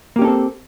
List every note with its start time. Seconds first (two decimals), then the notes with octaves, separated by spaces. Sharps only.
0.16 A#3
0.19 G4
0.22 C#4
0.25 A4
0.27 C4